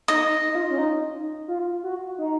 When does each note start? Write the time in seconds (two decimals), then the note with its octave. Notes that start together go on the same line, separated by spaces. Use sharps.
0.08 D#4 D#5
0.49 D#4
0.55 F4
0.70 C#4
0.78 D#4
1.48 F4
1.83 F#4
2.18 D#4